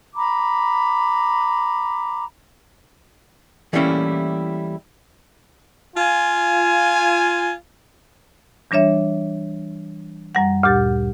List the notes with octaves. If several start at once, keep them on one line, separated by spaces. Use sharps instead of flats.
A#5 B5 D6
E3 G3 A3 A#3 C#4 E4
F4 G#5
E3 G3 D4 C#5 E5
F#2 G3 F#5
D2 A#2 G4 A6